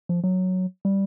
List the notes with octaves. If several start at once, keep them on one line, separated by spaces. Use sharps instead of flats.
F3
F#3
G3